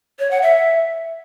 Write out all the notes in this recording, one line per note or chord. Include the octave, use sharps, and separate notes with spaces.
C#5
F#5
E5